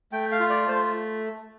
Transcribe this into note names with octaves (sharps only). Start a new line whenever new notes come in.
A3 G5
F5
F4
D5
A3 C5